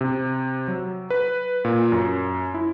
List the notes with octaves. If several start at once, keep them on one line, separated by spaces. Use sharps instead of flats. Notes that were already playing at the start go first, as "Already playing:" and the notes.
C3
F#3
B4
A#2
F#2
E4